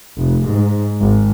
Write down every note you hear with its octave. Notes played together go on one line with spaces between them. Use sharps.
F1
G#2
G#1